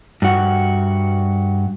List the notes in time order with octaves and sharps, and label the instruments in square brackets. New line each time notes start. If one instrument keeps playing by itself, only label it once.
[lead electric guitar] G2 F#4